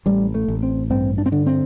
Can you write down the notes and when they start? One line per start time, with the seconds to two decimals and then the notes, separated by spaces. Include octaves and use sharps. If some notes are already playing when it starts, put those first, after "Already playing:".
0.06 A1 G3
0.35 A3
0.48 A1
0.63 C4
0.90 G2 C4
1.18 D4
1.26 C4
1.32 D3 D4
1.46 C4